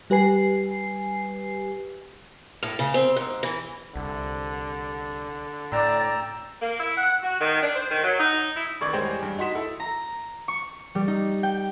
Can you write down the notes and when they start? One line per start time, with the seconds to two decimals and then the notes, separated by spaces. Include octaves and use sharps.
0.10 G3 G4 B4 G#5 C7
2.63 A2
2.79 C#3
2.94 C4
3.16 G#2
3.43 E3
3.96 C2 D3
5.72 A2 D5 G5 A#5 E6
6.62 A#3
6.79 E4
6.97 F#5
7.23 F#4
7.41 D#3
7.63 D4
7.76 C5
7.90 D#3
8.03 F#3
8.20 D#4
8.56 E4
8.81 A1 D#3 D5 C#6 G#6
8.93 E2 G3 G#3 C5 C#5 G5
9.22 G2
9.38 D#4 F#4 C6 B6 E7
9.55 E4 A4
9.80 A#5
10.48 C#6
10.95 G3
11.08 D#4
11.43 G5